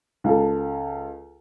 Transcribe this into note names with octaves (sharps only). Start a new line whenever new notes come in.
C#2 A4